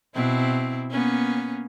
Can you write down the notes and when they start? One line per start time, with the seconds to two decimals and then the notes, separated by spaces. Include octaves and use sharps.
0.15 B2 C4 E4
0.91 A#3 B3 C#4